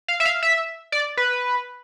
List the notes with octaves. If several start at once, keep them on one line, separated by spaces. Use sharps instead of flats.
F5
E5
F5
E5
D5
B4